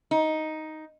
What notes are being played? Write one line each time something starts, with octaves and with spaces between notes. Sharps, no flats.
D#4